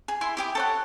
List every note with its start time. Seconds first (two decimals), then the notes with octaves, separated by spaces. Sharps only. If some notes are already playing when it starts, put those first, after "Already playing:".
0.08 G#4
0.21 E4 G#5 C6
0.37 E4 G4 D#6
0.55 A4 C#5 F#5